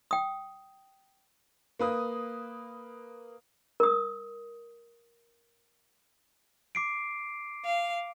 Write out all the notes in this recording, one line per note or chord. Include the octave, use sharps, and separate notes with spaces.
G5 D#6
A#3 B4 D#6
A#4 D#6
D6 C7 D7
F5